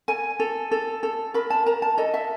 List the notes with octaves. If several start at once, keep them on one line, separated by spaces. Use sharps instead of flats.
A4 G#5
A4
A4
A4
A#4 B5
A5
A#4 A#5
A5
A4 D#5
E5